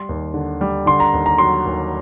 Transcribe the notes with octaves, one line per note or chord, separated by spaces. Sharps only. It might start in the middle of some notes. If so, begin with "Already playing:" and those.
Already playing: G3 C6
D#2
D3
G3
D3 C6
A#5
D#2
A#5
F#3 C6
D#2